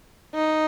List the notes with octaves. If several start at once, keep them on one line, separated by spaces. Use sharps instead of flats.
D#4